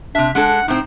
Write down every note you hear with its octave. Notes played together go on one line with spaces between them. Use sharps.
C3 D4 E5
G#3 D4 A4 F#5
A2 C4 D#4